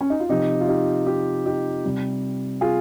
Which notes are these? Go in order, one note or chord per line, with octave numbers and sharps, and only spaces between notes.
C#4
D#4
F4
C3 F3 D#4 G4
F4
D#4 G4
D#4 G4
D#4 G4
C3 G3
F4 G#4